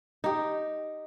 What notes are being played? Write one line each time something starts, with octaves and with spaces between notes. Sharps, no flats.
D#4 G4